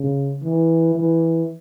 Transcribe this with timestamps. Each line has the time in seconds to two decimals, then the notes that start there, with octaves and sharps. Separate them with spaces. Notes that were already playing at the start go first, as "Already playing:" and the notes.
Already playing: C#3
0.43 E3
0.95 E3